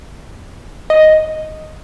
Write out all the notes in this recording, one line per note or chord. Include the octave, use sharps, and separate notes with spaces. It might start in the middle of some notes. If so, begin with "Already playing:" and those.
D#5